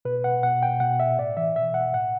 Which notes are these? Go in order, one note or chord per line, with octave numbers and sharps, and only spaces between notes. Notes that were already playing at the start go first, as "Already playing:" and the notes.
B2 B4
F#5
B2 F#5
G5
B2 F#5
E5
A2 D5
E3 E5
B2 E5
F#5
A2 F#5